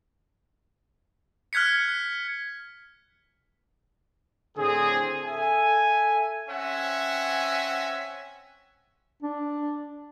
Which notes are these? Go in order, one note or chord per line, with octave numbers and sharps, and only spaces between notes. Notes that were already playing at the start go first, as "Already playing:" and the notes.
F6 F#6 G#6 B6 C#7
A2 D3 C4 G#4
A4 E5 G#5
C4 C#4 E5 F#5 G#5
D4